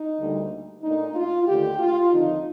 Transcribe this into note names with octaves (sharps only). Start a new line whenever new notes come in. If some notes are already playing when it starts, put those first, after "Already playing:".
Already playing: D#4
D2 D3 G3 A#3
A#2 A3 D4 D#4
F4
D#2 D3 A3 G4
F4
D#2 D3 F3 C4 D#4